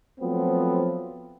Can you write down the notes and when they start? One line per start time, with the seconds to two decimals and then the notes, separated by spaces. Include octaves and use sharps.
0.20 F3 F#3 A3 B3 C4